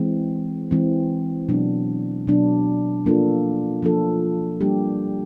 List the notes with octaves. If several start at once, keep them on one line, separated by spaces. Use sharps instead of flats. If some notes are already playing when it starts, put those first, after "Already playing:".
Already playing: E3 G#3 C4
E3 G#3 C4
B2 F#3 B3 D4
B2 F#3 B3 D4
F3 A#3 D4 F4 A4
F3 A#3 D4 F4 A4
G3 A#3 D4 G4